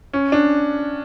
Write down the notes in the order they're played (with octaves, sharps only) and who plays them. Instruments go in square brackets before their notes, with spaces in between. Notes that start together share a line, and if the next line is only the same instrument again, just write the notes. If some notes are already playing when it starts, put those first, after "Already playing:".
[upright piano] C#4
D4